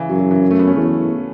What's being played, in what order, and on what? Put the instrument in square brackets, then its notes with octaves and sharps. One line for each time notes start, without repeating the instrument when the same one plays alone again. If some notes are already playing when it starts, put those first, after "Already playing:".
Already playing: [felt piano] C#3 E3
[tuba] F#2 [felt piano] F#3
[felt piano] F#3
E3
F#3
A3
B3
C#4
[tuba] E2 [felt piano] A3